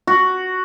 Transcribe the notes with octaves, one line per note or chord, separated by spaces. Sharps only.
F#4